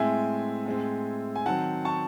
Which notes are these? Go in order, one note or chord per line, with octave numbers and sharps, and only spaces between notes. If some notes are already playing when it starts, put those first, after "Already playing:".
Already playing: A2 G#3 C4 E5 G#5
A2 G#3 C4
G#5
D#3 F#3 C4 F#5 A5
A5 C#6